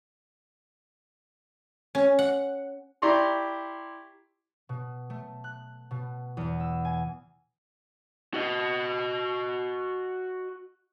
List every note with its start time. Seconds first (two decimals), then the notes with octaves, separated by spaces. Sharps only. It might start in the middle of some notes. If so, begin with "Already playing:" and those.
1.95 C#4
2.19 F#5
3.02 E4 G4 D5 A#5 C6 C#6
4.69 B2
5.10 A3
5.44 F#6
5.91 B2
6.37 E2
6.60 E6
6.85 G#5
8.34 F#4 D#5